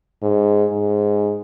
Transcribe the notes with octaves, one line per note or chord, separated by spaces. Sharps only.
G#2
G#2